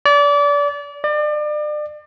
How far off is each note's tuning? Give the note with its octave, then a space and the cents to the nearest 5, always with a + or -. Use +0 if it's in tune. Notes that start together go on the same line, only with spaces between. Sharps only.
D5 -30
D5 +35